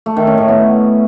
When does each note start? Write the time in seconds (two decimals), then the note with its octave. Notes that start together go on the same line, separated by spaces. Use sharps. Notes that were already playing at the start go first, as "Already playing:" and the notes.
0.06 A3
0.17 D#3
0.27 C#4
0.38 A2
0.48 B3